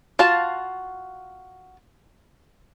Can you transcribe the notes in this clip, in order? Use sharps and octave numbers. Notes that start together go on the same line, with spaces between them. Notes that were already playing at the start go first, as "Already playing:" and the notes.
F4 F#4 F5 A5